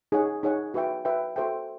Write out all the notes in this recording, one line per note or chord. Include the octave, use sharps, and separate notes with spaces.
D#4 G#4 C#5 F#5
D#4 G#4 C#5 F#5
F#4 B4 E5 G5
F#4 B4 E5 G5
F#4 A4 C5 E5 G5